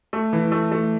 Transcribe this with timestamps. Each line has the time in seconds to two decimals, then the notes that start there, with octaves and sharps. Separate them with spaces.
0.13 A3
0.33 E3
0.52 A3
0.72 A3